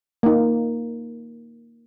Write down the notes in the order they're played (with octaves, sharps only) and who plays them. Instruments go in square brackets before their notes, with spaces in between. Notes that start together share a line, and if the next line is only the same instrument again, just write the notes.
[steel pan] A#3 D#4